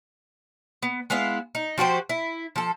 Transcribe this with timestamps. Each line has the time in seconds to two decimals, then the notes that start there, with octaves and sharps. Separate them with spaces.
0.82 B3
1.10 G#3 B3 E4 F5
1.55 D#4
1.78 F3 F#4 G4 C5
2.09 E4
2.56 F3 A4